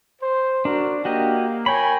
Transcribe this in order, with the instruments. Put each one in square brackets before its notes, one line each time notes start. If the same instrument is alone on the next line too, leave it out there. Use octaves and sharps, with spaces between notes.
[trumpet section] C5
[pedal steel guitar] D4 [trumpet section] F#4 A#4
[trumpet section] A#3 [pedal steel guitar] F#4 G4 D#5
[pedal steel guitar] A#4 G5 B5 [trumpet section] C#5 G#5